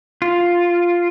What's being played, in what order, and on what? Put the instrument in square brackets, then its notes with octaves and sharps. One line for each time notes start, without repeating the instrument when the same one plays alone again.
[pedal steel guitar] F4